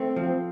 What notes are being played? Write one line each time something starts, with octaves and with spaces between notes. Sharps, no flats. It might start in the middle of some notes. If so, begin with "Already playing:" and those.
Already playing: A3 C4
F3